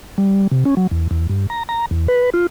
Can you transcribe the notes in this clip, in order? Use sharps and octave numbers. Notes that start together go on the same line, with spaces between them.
G3
C3
C#4
F#3
E2
E2
G2
A#5
A#5
E2
B4
F4